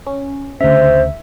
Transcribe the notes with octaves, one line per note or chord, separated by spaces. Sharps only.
C#4
D2 C#3 C5 E5